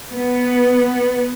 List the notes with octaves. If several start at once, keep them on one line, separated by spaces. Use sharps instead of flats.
B3